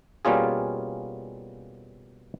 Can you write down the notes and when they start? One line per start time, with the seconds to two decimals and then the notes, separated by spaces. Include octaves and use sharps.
0.25 B2 G3 A#3 C#4 F4 G#4